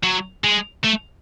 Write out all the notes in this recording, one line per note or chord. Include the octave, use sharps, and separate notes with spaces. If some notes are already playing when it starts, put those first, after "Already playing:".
F#3
G#3
A3